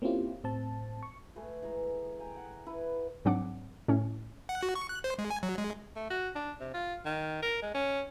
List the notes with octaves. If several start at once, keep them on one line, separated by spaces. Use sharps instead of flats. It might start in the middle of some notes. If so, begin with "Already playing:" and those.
A#3 C4 C#4 E4 F4 G4
A2 C4 A5
C#6
A3 G#4 B4
E3 G#3 A#5
G5 G#5 A#5
F#5
E4 B4
G#2 F#3 C4 D4 F#5 D6
A2 C#4
F#5
F#4
C#6
F#6
C5
G#3
G#5
F#3
G#3
A3
F#4
D4
C3
F4
D#3
A#4
G#3
C#4